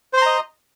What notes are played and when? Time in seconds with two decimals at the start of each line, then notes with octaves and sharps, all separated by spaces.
0.13 C5
0.18 C6
0.22 A#5
0.26 D#5